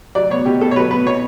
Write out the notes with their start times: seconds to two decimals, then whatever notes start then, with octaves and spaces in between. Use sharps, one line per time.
0.15 F#3 D5
0.30 B3 C#5
0.45 B2 G4
0.61 B2 A4
0.71 C#5
0.76 F#3 B4
0.91 B3 B4
1.06 B2 C#5